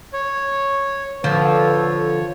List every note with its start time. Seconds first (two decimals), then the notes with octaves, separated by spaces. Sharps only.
0.13 C#5
1.24 D3 F3 A4 B4 C#5